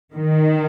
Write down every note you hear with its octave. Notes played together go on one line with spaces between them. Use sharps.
D#3